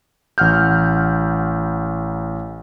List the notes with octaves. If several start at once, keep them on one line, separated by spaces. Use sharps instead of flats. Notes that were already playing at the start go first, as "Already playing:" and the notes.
A1 F#5 F6 G6